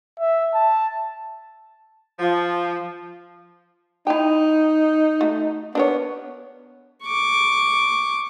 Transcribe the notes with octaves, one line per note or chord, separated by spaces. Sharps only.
E5
A5
F3
D#4 E4 G5
A3 F#4
B3 D4 A#4 C#5
C#6 D6